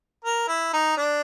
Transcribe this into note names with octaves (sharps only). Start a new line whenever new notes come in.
A#4
E4
D#4
D4